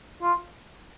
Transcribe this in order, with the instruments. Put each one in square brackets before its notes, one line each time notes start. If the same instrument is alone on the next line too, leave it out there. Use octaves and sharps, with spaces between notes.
[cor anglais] F4